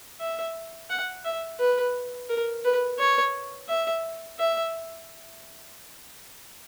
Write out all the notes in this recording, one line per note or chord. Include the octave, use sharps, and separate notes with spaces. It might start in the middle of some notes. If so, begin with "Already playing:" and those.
E5
F#5
E5
B4
A#4
B4
C#5
E5
E5